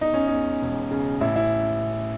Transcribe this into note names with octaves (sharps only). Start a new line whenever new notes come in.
E2 D#4
C#4
E2 D#4
E1
C#3
A1 E4
E4